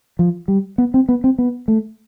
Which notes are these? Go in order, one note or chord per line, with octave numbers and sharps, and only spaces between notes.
F3
G3
B3
C4
B3
C4
B3
A3